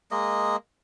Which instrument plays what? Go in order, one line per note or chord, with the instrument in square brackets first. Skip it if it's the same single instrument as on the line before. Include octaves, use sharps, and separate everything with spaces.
[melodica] G#3 A#3 D#5